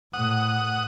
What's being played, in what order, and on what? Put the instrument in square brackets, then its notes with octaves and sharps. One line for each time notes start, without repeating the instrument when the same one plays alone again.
[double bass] A2 [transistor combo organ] F#5 D#6